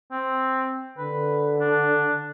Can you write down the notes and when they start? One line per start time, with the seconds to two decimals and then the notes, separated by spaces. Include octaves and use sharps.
0.11 C4
0.98 D3 B4
1.60 D4